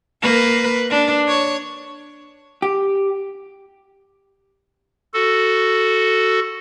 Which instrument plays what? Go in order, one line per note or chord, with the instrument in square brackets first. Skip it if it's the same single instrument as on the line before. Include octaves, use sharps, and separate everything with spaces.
[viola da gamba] A#3 B4
D4
C#5
[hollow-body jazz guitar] G4
[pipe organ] F#4 A4